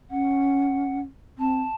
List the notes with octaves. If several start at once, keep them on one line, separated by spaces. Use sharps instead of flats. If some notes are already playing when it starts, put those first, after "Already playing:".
C#4 F#5
C4 A5